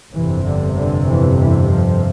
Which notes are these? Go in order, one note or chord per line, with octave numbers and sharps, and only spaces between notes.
G1 F2 C3 E3
D3
D3
E3
E3
F3